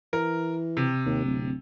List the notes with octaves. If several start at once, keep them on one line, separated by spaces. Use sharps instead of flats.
E3 A#4
C3
D#2
D1